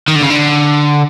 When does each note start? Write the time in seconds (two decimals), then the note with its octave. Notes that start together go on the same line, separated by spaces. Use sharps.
0.08 D#3
0.16 D3
0.23 C#3
0.30 D3